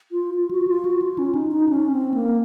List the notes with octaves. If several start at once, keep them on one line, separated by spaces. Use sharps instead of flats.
F4
F4
F#4
F4
F#4
F4
C#4
D#4
D#4
C#4
C4
A#3